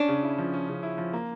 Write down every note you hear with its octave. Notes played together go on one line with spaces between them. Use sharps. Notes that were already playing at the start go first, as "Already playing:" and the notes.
Already playing: C#4 D4
C#3
E4
F3
C#4
C#3
E4
F3
A#3